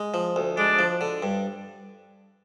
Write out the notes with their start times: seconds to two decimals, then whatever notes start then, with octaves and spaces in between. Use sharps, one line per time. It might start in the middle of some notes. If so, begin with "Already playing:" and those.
Already playing: G#3
0.14 F3
0.36 D2
0.57 G#3 D4
0.79 F3
1.01 D3
1.23 G2